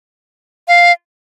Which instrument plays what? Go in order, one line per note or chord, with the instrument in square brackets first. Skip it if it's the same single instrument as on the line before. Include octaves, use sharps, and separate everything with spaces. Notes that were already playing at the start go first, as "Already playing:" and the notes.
[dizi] F5